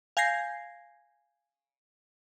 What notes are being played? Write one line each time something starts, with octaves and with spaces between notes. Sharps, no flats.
F5 G#5 G6 G#6 A#6 C7